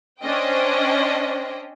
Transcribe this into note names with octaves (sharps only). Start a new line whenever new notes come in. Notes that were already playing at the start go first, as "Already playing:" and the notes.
C#4 D4 C5 D#5 G5